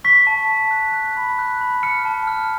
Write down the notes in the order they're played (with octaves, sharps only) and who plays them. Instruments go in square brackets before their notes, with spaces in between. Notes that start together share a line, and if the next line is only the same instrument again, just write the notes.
[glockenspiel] C#6 B6
A5
A5
F#6
F#6
B5
F#6
B5
F6 C#7
A5
F6